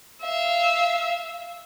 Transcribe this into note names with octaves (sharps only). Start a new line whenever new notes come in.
E5 F5